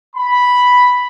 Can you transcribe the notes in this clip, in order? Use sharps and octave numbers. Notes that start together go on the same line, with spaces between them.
B5